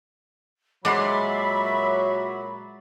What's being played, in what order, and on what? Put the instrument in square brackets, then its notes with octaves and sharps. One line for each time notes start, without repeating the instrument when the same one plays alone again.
[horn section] A#2 F#3 [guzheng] G#3 F#5 [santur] D5 C6 [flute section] E5 B5